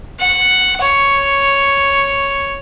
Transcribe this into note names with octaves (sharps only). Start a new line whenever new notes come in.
F#5
C#5